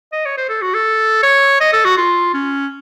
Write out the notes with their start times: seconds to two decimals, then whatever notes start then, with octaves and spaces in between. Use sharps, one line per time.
0.12 D#5
0.25 C#5
0.37 C5
0.49 A4
0.62 F#4
0.74 A4
1.23 C#5
1.60 D#5
1.73 A4
1.85 F#4
1.97 F4
2.34 C#4